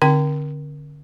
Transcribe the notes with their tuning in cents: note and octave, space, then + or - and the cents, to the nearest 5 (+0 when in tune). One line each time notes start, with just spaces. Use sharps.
D3 +0 C4 +35 G5 -20